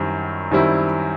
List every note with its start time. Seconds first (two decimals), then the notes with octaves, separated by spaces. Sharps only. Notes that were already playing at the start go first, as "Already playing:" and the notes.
Already playing: F#2 D#3 G3 C4 E4
0.51 F#2 D#3 G3 C4 E4